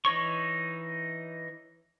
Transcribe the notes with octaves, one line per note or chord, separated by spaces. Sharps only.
E3 D#4 C#5 C#6